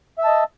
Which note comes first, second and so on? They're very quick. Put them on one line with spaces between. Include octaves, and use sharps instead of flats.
E5 E6 A5 D#5